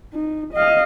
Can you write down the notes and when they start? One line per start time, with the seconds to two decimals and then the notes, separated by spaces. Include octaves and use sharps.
0.13 D#4
0.53 D#5 F5